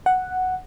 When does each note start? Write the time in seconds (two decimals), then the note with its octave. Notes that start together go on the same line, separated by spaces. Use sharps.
0.06 F#5